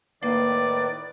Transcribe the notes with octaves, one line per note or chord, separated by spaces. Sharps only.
A2 D#3 A#3 B4 D5